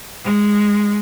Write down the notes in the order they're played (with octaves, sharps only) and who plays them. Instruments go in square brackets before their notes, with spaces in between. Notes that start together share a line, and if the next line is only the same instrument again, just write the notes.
[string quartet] G#3